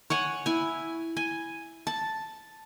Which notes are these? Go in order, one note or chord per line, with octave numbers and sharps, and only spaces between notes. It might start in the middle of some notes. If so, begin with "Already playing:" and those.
C#5 F#5 G#5
E4 G#5
G#5
A5